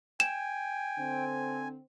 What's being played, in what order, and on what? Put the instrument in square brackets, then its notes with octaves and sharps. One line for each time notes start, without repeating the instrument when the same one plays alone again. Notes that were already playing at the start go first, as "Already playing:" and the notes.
[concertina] G5 [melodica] G#5 [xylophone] E7
[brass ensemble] D3 C4